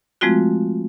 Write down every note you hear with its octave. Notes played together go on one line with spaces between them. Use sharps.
F3 G#3 A3 C4 F4 F#4